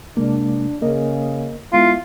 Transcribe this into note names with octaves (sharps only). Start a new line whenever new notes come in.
C3 G#3 A#3 D4
C#3 A#3 A#4 D#5
G#3 B3 E4 F4